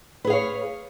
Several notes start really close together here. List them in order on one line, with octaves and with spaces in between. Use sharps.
B4 G#4 F5 C#5